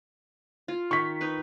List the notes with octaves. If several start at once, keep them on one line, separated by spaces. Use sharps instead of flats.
F4
D#3 C#6 B6
D#4 B4